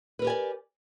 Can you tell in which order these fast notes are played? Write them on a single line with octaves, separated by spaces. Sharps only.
B4 A#4 G4 G#5 D5